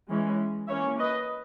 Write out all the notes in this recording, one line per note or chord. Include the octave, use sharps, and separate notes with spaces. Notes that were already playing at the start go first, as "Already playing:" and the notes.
E3 G#3 C#4
E3 A#3 C#4 C#5 E5
B4 D#5